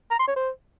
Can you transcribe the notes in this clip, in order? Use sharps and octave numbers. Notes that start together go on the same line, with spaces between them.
A#5
C6
C#5
C5